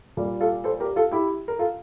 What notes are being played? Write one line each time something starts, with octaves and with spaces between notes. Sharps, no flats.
A#2 G3
F4 A4
A4 C5
G4 A#4
F4 A4
E4 G4
A#4
F4 A4